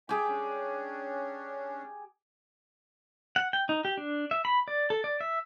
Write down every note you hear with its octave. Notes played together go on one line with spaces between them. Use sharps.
G4 G#4 E5 G5 G#5
C#4 D4
F#5
G5
D#4
G4
D4
E5
B5
D5
A4
D5
E5